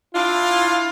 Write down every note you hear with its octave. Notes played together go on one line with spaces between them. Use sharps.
D4 E4 F4